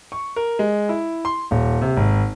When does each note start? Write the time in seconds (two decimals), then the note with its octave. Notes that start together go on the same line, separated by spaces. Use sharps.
0.12 C#6
0.36 A#4
0.59 G#3
0.89 E4
1.25 C6
1.51 D#1
1.81 C3
1.97 G#1